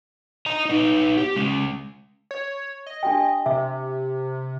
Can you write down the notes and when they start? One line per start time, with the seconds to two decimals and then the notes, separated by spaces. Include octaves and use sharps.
0.46 D#5 A#5
0.65 B3 D#4
1.18 G4
1.36 G#3 C#4
2.31 C#5
2.87 D#5
3.03 D4 G4 G5
3.46 C3 E5